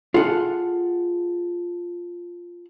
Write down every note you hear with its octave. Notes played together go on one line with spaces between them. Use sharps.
F4 G#4 A4 F#5